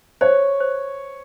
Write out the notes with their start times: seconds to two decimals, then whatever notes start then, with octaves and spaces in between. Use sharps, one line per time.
0.21 C5 C#5
0.60 C5